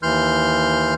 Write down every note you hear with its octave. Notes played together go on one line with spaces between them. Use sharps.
D#2 E3 C6 F6 G6